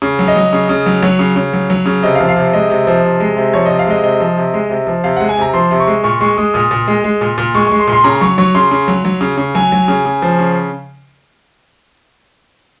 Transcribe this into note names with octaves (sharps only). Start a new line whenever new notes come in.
C#3
F#3
D#5
F#3
C#3
C#3
F#3
F#3 C#5
C#3
C#3
F#3
F#3
C#3
C3 D#5
F5
F3
F5
C3
G#3 D#5
C3
F3
C3
G#3
C3
F3 C#5
C3 D#5
F5
G#3 D#5
C3 D#5
F3
C3
G#3
C3
F3
C3 F5
G#3 F#5
G#5
C3 A#5
F3 C6
C3
C#6
G#3
A#2 C#6
G#3 C#6
G#3 D#6
A#2 D#6
A#2
G#3
G#3
A#2
A#2
G#3 C#6
G#3 C#6
C6
A#2
C6
C#3 A#5
F#3 C#6
F#3 C#6
C#3 C6
C#3
F#3
F#3
C#3
C#3
F#3 G#5
F#3
C#3
C#3
F3
C#3